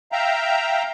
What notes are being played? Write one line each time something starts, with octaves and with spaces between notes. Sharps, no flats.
E5 F5 G5 A#5